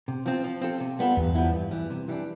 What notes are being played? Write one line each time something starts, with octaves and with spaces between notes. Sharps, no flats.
C3
F3 C4 F4
F3
C4 F4 A4
C3
G3 B3 F4 A4
E2 G2
F3 B3 E4
G2
E3 G3
C3
E3 G3 D4